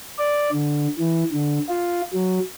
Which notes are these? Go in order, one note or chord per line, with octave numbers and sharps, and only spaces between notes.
D5
D3
E3
D3
F4
F#3